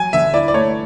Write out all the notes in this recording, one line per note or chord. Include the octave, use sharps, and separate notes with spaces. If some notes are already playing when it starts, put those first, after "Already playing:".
Already playing: F#3 G#5
D3 E5
E4 D5
D5
A3 C#5